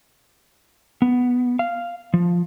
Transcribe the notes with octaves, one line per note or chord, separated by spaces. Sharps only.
B3
F5
F3